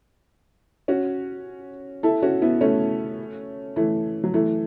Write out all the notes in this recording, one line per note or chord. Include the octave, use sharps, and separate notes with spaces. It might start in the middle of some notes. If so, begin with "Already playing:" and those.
C#4 F#4
E4 A4
C#4 F#4
B3 E4
A3 C#4
E3 A3
F#3
E3 A3